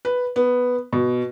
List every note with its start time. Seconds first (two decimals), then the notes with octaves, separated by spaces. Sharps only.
0.05 B4
0.36 B3
0.93 B2